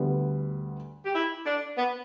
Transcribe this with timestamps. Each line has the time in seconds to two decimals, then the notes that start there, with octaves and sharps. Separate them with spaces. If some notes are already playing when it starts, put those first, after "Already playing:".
Already playing: D2 D3 G3 B3
1.04 G4
1.14 E4
1.46 D4
1.77 B3